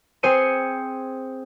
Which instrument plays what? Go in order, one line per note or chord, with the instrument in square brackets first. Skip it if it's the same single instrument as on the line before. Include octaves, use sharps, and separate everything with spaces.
[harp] C4 G#4 C5 C#7 D#7